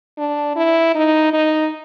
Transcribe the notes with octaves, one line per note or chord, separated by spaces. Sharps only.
D4
E4
D#4
D#4